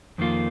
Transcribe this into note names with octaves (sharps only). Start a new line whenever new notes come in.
F2 D#3 A#3 F4